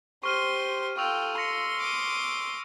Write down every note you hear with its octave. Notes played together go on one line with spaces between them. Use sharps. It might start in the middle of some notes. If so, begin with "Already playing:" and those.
G4 C5 C6 C#6 F6 D#7
F4 A4 G5 C#6 E6 F7
C6 A#6 C#7
D6 D#6